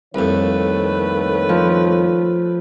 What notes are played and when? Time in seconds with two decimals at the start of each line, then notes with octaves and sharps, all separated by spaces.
0.14 C2 F2 D#3 A3 A#3 B4 C#5
1.49 F3